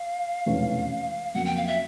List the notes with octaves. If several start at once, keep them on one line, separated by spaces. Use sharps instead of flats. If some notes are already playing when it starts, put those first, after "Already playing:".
Already playing: F5
F1 E2 B2 G#3 C#4
F2 C#3 F#3 A#3 F#5
G5
F5
E5